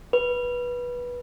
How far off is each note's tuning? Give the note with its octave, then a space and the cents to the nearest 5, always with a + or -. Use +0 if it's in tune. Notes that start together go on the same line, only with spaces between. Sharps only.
B4 -15